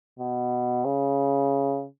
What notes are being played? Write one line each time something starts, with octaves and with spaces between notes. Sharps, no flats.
B2
C#3